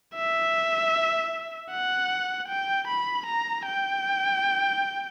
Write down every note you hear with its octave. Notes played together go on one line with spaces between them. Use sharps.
E5
F#5
G5
B5
A#5
G5